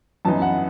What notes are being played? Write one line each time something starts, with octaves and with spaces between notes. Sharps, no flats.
F#2 E3 B3 D#4 A5
F#5